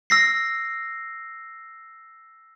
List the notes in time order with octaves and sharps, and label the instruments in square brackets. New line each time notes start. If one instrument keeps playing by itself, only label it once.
[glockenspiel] E6 A#6 C7